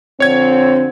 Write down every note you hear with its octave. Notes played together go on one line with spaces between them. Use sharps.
F2 D3 C4 C#5 G#6